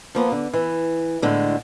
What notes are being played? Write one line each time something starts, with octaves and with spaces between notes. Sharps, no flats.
F3 A#3 B3
D3
E3
A2 D3 G#3